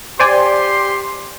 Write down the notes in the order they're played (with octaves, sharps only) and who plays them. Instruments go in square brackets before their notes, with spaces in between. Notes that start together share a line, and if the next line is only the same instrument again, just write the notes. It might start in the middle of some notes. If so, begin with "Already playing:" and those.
[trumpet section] G4 C6 [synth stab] C5 D5 G#5